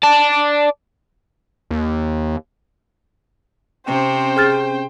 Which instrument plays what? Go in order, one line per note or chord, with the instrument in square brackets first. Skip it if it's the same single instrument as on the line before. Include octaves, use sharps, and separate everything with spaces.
[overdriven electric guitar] D5 A5
[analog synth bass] D#2
[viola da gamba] C3 [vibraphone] C4 C#4 [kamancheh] C5 G5
[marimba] G#4 F6 A6